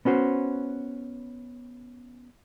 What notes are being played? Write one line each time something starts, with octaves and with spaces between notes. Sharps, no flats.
B3 C#4 F#4 C5